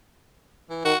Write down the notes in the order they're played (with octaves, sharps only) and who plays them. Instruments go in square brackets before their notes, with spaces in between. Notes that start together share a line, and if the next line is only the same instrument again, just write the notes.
[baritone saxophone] E3
[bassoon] D#3 [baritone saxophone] F#4